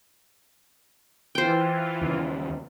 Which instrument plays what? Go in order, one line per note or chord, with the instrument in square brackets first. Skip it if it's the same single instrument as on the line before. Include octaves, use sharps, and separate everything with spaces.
[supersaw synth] E3 F4 [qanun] C5 G5
[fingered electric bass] D#2 C#3